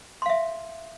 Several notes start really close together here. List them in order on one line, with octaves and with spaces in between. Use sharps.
C6 F5 E5